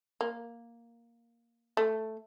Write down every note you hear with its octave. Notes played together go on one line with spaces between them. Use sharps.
A#3
A3